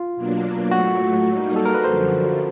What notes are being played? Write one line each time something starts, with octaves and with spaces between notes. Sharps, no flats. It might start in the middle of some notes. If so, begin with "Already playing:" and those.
Already playing: F4
B2 F#3 A#3 D4
A2 F#3 A3 F#4
G3 A#3 D#4
A4
A#4
B4
F#2 D3 F3 C5